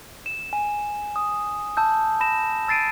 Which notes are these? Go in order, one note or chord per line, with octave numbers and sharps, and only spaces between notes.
E7
G#5
D#6
A5 E6 G6
B5 A#6 E7
E6 A6 C7 D7 D#7